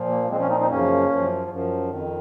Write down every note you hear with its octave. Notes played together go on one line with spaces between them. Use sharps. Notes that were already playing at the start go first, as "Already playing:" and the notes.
Already playing: A#2 F3
A#3
A#2 F3 G#3 C4
A#3 C#4
C4 D#4
C4 D#4
F#2 C#3 F3 A#3 C#4
F#2 F3
F#2 F3
F2 D#3